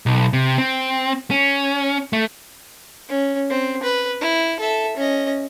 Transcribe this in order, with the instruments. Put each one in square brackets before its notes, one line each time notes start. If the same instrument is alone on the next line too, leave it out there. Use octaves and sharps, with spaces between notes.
[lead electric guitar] B1
C3
C4
C#4
A3
[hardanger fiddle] C#4
C4
B4
E4
A4 E5
C#4 D#5